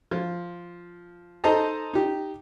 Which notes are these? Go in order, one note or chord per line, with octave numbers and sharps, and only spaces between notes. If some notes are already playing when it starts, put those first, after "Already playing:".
F3
D#4 A4 C5 D#5 A5 A#5
D#4 G4